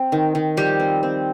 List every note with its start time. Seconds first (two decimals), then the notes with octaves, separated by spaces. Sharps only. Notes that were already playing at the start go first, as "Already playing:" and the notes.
Already playing: C4
0.12 D#3
0.35 D#3
0.57 F3 G3 G4
0.80 C4
1.03 C4